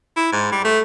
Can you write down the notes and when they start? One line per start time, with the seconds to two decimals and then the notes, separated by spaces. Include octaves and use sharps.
0.16 E4
0.32 G#2
0.52 G3
0.64 A3